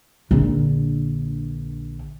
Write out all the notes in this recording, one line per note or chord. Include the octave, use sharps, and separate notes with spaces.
A#1 D3